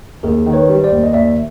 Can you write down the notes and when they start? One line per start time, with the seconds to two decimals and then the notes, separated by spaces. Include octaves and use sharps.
0.23 D#2 G#4 A#4
0.46 D#3
0.53 B4 C#5
0.69 G3
0.84 C5 D5
0.91 D#2
1.04 D#5
1.13 D#2 D5 E5